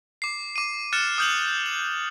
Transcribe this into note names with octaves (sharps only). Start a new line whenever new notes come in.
D6 C7
D6 D#7
F6 F#6 A6 C#7 D#7 E7
D#6 F6 G6 F7 F#7
F#7